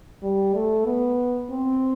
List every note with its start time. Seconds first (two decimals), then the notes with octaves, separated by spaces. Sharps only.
0.23 G3
0.54 A3
0.85 B3
1.50 C4